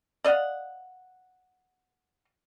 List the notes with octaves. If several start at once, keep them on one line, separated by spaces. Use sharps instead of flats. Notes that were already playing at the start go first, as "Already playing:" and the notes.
D5 D#5 F5 F#5